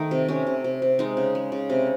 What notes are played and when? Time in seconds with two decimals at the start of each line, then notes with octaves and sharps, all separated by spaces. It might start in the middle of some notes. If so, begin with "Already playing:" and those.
Already playing: D#3 A3 D#4
0.11 C3
0.29 C3 C#4
0.47 C3
0.64 C3
0.82 C3
0.99 G#3 D#4
1.17 C#3
1.35 G#3
1.52 C#3
1.70 C3